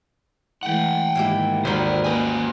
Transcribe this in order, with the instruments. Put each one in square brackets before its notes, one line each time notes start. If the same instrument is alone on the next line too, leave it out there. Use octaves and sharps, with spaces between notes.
[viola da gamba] E3 G#3 A3 [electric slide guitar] F#5 G5
[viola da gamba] G#2 D#3 [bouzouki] A#3 E4 G4
[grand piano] G#1 D#2 G7 [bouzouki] D3 A#4 [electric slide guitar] A4 C5
[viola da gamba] A#3 [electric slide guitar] C#4 G4 G#5 [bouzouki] D#4 B4